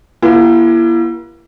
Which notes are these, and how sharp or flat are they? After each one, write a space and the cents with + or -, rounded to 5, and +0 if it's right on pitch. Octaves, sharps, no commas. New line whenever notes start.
A#3 +35 E4 +30 G4 -15